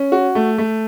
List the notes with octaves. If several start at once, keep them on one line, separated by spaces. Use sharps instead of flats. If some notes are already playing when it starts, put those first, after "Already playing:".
Already playing: C#4
F#4
A3
A3